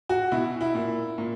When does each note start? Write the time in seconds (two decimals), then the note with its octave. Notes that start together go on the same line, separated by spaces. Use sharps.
0.09 F#4
0.32 B2 E4
0.61 E4
0.75 A#2
1.18 A#2